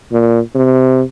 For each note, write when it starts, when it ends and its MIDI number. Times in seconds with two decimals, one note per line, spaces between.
0.12 0.40 46
0.55 1.02 48